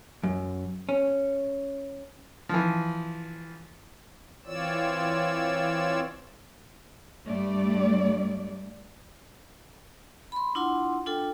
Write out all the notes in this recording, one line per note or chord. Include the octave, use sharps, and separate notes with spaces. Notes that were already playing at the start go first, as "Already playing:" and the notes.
F#2
C#4
E3 F3
E3 C4 F4 C#5 D5 E6
G2 G3 A3 D5
B5 C6
D4 E4 F4 F#5 C6
D4 F4 A4 G5